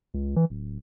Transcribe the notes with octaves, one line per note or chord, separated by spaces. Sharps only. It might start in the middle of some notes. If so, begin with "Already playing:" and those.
C#2
E3
D1